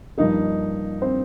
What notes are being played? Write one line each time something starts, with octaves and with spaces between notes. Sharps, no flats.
G2 F3 A#3 D#4 D#5
C4 C5